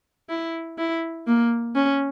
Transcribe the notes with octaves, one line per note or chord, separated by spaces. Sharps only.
E4
E4
A#3
C#4